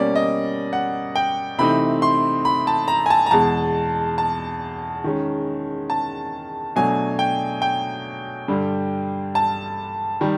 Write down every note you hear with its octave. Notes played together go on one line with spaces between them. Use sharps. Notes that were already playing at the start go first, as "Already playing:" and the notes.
Already playing: B2 G3 A#3 C#4 D5
D#5
F#5
G5
C3 E3 A3 C4 D#4 B5
C6
B5
A5
A#5
G#5
A5
A#5
E2 B2 G#3 A5
A5
D#3 G#3 C#4
A5
B2 F#3 A3 D4 G#5
G5
G5
G2 D3 G3
A5
D#3 G3